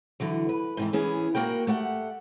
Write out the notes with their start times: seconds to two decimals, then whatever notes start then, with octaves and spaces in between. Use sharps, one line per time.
0.20 D3 E3 F#3
0.49 B4
0.77 G#2 C3 E3
0.93 E3 B3 C#4 G#4
1.35 A#2 A#3 F#4 A#4 G5
1.67 A3 G4 F#5